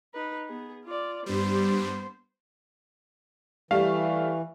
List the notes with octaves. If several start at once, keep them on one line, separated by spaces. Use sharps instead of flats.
D#4 B4
B3 G#4
F4 D5
G2 G3 B3 C5
E3 G3 A3 F5